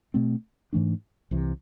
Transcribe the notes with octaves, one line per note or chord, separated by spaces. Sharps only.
B2 A3 C4
G#2 E3 A3 D4
C2 C3 E3